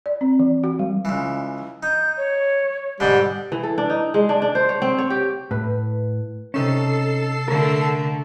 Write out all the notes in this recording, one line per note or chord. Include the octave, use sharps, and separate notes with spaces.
D5
C4
E3
F#4
G3
C#2 E3
D#4 G6
C#5
G#2 B2 D3 G3
E3
A4
D4
D#4
G#3
D4
D4
C5
C#5
C4
C#5
G4
A2 B4
C3 C#4 D#4 A4 C#6 C7 E7
D3 A3 A#4